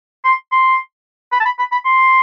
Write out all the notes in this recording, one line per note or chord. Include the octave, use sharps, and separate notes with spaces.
C6
C6
B5
A5
B5
B5
B5
C6